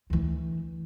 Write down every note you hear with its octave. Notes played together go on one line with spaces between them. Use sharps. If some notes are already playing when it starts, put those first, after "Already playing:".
D2 E3